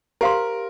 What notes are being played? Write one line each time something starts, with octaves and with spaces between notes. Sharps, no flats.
G4 A#4 C5 F5 C6